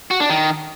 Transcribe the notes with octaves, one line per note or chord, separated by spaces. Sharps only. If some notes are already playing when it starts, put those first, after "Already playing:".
F#4
D4
D#3